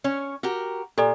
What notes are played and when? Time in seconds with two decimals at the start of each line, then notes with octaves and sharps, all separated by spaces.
0.04 C#4 C#5
0.43 F#4 G4 A#4
0.98 A#2 G4 A4 D5